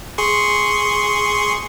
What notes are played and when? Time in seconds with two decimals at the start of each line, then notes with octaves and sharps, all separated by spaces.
0.18 G#4 C6 C#6